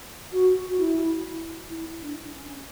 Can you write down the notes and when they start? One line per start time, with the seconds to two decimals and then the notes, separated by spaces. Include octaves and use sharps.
0.32 F#4
0.69 F#4
0.79 E4
1.70 E4
2.01 D4
2.32 C#4